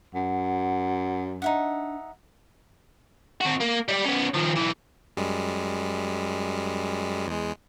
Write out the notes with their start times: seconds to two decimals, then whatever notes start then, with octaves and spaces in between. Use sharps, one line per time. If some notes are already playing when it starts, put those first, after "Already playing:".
0.14 F#2 F#5
1.42 D4 D#4 E5 F#5
3.41 C4 F#4
3.60 A#3
3.88 G3 D5
4.05 B3 C#4
4.34 D#3 F3
4.56 B1 E3
5.17 F#2 G3 G#3
7.27 E2 G#3